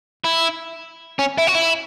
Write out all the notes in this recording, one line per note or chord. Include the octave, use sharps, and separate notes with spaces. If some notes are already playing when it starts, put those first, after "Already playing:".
E4
C#4
E4
F#4
E4